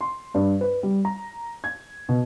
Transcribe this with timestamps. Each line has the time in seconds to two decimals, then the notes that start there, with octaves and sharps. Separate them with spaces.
0.01 C6
0.34 G2
0.61 B4
0.83 G3
1.05 A#5
1.64 G#6
2.09 B2